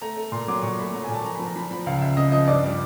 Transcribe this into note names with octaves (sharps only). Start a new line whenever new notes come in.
A3 A#5
A3
A#2 C6
F#3 D6
A#2 C#6
A3 B5
F#3 A#5
G#5
A#2
A5
F3 A#5
B5
F3
A#5
F3 B5
F3 B5
C#2 F5
C#2 E5
C#3 D#5
F3 D#5
G2 D5
G3